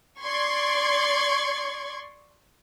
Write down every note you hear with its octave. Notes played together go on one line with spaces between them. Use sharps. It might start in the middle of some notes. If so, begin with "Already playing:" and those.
D5 C6 C#6 G#6